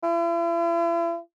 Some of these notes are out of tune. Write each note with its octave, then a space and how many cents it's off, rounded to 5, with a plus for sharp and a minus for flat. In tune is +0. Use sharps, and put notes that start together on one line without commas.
E4 +45